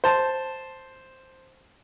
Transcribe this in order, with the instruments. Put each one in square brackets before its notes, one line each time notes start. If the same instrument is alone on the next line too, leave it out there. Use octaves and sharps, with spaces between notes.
[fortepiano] C5 A5